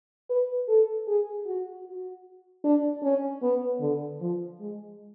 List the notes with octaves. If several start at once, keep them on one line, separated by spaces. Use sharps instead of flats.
B4
A4
G#4
F#4
F#4
D4
C#4
B3
D3
F3
G#3